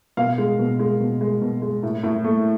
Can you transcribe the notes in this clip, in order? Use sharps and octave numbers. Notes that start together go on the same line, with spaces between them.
B2 F5
G#3
B2
G#3
B2
G#3
B2
G#3
A2
A2
A3